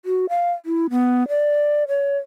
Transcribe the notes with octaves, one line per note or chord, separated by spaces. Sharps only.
F#4
F5
E4
B3
D5
C#5